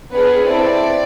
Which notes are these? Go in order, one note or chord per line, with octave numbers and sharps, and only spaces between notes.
B3 D4 G#4 B4
C4 E4 A4 D5